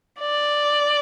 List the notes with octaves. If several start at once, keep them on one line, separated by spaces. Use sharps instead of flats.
D5